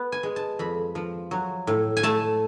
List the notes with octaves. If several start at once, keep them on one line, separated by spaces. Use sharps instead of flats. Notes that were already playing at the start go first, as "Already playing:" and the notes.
Already playing: B3
G#5
G#3
A5
F2 B5
F3
F#3
A2
G#5
A3 A5